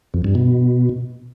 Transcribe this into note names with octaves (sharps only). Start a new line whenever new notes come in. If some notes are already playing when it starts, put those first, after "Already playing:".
F2
G2
B2